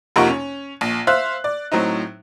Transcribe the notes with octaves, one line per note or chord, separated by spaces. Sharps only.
F2 C3 A#3 D#4 F#5 C#6
C#4
A#1
C5 E5 F5 F#6
D5
A2 F#3 C4 D#4